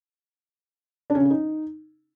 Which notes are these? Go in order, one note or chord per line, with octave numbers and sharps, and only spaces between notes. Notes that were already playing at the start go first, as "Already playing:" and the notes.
D4
C#4
C#3
C#4
D#4